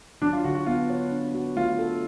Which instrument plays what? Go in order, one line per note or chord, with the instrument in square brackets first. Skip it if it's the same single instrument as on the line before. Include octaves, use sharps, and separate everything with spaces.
[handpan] F#3 [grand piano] D4
[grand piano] F4
[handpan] D3 [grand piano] F#4
[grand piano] F#4
[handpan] B3 [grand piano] F4
[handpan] C#5
D4
F#4
[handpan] A3 [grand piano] F4
[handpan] A4